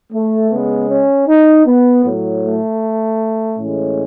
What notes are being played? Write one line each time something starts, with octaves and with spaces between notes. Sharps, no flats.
A3
C#3 G#3 B3
C#4
D#4
B3
A2 F#3
A3
A2 E3 G#3 C#4